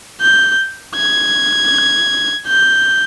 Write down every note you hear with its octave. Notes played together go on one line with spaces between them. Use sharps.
G6
G#6
G6